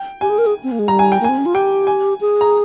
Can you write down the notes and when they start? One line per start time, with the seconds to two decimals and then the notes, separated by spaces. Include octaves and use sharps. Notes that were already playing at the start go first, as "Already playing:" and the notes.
Already playing: G5
0.21 G4 G#5
0.30 G#4
0.38 A#4
0.46 G#4
0.63 C4
0.72 A#3
0.79 G#3
0.88 G3 A#5
0.99 G#5
1.12 G5
1.21 A#3
1.24 C4 G#5
1.38 C#4
1.46 F4
1.54 G4 G5
1.87 G#5
2.21 G#4
2.41 A#5